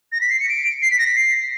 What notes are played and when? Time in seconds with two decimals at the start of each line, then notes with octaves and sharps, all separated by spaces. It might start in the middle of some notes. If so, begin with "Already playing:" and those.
0.12 A#6
0.21 B6
0.30 C7
0.40 C#7
0.49 D7
0.82 C7
0.91 B6
0.99 A#6
1.07 B6
1.16 C7